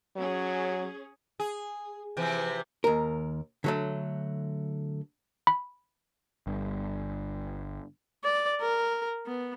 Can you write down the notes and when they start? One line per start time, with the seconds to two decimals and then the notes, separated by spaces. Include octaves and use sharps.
0.17 F#3 C#4 G#4
1.40 G#4
2.17 C3 E3 F3
2.84 D#2 A#4
3.64 D3 F#3 A3
5.47 B5
6.47 G1 G2
8.24 D5
8.61 A#4
9.27 B3